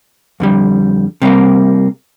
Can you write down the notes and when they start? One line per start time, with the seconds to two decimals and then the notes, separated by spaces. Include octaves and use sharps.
0.40 F2 D3 G3
1.22 C3 G3 A#3